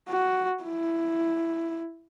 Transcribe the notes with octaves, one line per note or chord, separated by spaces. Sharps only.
F#4
E4